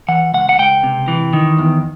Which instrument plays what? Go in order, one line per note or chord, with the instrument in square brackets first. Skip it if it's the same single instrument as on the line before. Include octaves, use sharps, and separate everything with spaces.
[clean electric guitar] E3 F#5
C#2 F#5
F#5
C#2 G5
C3
E3
D#3
E2